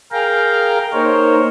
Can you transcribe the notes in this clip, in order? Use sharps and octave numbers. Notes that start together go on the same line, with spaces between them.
G#4 A#4 F5 G5 A#5
A#3 D#4 A#4 C5 C#5